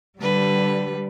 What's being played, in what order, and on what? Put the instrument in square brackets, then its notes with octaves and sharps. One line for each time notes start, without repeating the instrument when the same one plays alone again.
[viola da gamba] D3 B4 [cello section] G3